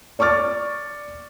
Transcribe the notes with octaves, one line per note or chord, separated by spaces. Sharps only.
D5 C#6 D6 F6 A6